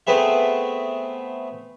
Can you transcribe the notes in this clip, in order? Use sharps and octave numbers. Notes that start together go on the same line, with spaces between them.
A3 B3 C4 G#4 B4 E5